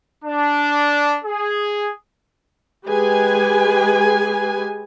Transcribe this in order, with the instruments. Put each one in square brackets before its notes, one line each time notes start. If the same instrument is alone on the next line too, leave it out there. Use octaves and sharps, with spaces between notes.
[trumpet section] D4
G#4
[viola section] G#3 G4 G#4 B4 G#5